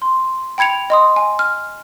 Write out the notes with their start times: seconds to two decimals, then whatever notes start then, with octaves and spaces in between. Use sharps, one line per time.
0.02 C6
0.58 G5 B5 G#6 C#7 F7
0.90 D#5 C6 D#6
1.16 G#5
1.39 F6